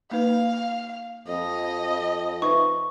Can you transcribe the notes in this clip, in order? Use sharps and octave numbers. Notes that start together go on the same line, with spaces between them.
A#3 D#4 B4 F5
F2 D#5
D#4 B4 E5 C#6